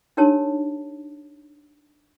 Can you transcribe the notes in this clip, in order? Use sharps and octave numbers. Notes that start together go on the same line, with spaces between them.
D4 D#4 G4 A#4 C#5 A5